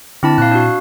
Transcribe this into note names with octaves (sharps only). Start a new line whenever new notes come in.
D3 C4 E4 A5
A#2 F5 F#6
D4 F#4